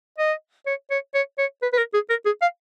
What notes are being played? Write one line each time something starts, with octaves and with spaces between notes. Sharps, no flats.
D#5
C#5
C#5
C#5
C#5
B4
B4
A#4
G#4
A#4
G#4
F5